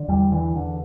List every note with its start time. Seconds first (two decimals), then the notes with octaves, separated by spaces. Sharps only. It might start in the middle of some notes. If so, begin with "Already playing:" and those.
Already playing: D3
0.08 E2 G3
0.32 D3 E3
0.55 E2 D3